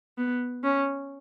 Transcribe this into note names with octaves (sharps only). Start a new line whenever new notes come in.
B3
C#4